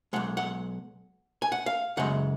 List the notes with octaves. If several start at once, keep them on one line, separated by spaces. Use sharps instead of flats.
B1 A#2 G#3 F#5
F#5
G#5
F#5
F5
F#2 C#3 G#3 F#5